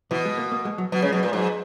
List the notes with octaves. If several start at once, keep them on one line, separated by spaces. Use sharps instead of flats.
B2 E3
G#3
A#3
A#3
G#3
F#3
B2 F#3
C#3 G#3
B2 F#3
A#2 G#3
G#2 F#3